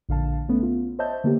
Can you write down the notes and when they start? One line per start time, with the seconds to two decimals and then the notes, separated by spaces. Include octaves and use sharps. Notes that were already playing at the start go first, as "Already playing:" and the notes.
0.09 A#1 D3 F5 A5
0.49 A3 B3 C#4
0.63 F4
0.99 C5 C#5 D#5 E5 A5 G6
1.24 D3 A#3 B3 G4